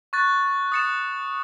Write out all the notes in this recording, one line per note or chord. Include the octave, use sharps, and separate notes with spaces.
C#6 F#6 A6
D#6 A6 C#7 E7